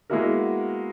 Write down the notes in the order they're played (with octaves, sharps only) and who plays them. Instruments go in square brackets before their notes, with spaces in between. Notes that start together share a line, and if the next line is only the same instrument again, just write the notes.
[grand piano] G#3 A#3 B3 E4 F#4 A#4